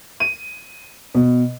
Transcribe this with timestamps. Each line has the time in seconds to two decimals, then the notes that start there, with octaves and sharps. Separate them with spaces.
0.20 D#7
1.15 B2